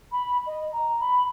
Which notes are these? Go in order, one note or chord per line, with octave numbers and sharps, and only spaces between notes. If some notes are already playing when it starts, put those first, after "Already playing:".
B5
D#5
A#5
B5